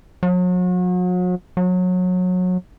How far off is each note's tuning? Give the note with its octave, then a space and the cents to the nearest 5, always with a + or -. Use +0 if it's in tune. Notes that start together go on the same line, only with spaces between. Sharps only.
F#3 -40
F#3 -25